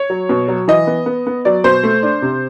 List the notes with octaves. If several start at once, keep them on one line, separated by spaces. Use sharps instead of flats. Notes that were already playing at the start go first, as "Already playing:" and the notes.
Already playing: C#5
F#3
B2
F#3
E3 D#5
B3
B3
B3
F#3 D5
B2 C5
A3
D4
C3